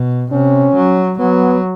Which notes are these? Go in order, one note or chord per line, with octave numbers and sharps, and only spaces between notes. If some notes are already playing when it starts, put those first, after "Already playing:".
Already playing: B2
C3 C#4
F#3
F#3 B3